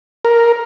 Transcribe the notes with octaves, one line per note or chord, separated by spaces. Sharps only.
A#4